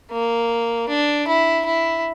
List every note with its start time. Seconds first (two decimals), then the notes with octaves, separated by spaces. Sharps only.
0.12 A#3
0.89 D4
1.28 E4
1.66 E4